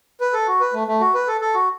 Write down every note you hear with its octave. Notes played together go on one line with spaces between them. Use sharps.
B4
A4
F#4
B4
A3
A3
F#4
B4
A4
A4
F#4